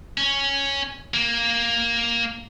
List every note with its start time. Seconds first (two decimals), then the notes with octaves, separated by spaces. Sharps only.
0.18 C#4
1.14 A#3